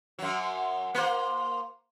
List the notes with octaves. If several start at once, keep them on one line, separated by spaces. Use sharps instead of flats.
F#2 F#3
A#3 C5